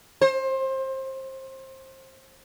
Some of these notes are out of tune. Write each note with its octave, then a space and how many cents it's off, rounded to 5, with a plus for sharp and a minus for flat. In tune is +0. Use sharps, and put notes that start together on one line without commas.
C5 +25